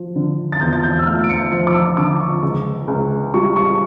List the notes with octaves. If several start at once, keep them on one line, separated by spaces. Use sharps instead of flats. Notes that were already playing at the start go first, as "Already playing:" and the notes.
Already playing: F3
D3
A6
E2 G6
A6
G6
E6
A3 F6
D7
C#7
F3 C#7
D6
E6
D3 D6
C#6
C#2
C#2
G3 C#6
C#6